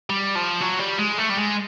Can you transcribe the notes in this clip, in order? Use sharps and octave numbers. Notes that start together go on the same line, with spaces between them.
G3
F3
F#3
G3
G#3
A3
G3
G#3